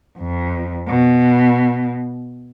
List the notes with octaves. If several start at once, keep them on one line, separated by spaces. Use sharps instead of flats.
F2
B2